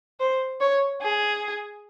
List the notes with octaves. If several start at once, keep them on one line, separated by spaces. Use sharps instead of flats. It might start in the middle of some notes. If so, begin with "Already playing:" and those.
C5
C#5
G#4